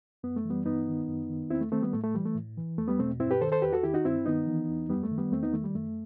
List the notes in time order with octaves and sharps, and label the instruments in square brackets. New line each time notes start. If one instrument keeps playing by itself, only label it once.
[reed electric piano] F#2 B3
A3
E3
G3 B3
G2 B3 D#4
D#3
F#2
D#3
E2 C4 E4
A3
D#3 A3 C4
G3 B3
A2 A3
A3
E3 G3
A3
A2
E3
E2 A3
G3 B3
B2 A3 C4
G2 C4 E4
G4 B4
D#3 A4 C5
A4 C5
E2 G4 B4
F#4 A4
D#3 E4 G4
D#4 F#4
G2 C4 E4
D#3 B3 D#4
E3
E2
F#2 G3 B3
A3
D#3
G3 B3
E2 A3 C4
B3 D#4
D#3 A3
G3
F#2 A3